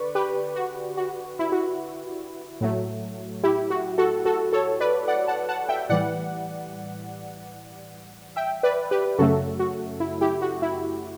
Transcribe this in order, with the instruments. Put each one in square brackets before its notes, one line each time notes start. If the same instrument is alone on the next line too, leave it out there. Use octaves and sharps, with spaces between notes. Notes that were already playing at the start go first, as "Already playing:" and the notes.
Already playing: [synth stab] D3 B4 D5 C#6
G4 B4
F#4
F#4
E4
F#4
A2 F#3 A3
E4 G4
F#4
F#4 A4
F#4 A4
A4 C#5
B4 D5
D5 F#5
F#5 A5
F#5 A5
E5 G5
A2 E3 G3 D5 F#5
E5 G5
B4 D5
G4 B4
F#2 C#3 F#3 A3 F#4 A4
F#4
E4
E4 G4
F#4
E4